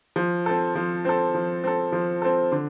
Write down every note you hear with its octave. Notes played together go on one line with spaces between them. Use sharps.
F3
C4 A4
F3
C4 A4
F3
C4 A4
F3
C4 A4
D3